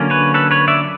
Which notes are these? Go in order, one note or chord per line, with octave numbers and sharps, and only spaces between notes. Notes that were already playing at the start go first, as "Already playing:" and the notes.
Already playing: D3 F#3 A#3 C#4
B4 C#5
A4 B4
B4 C#5
D5 E5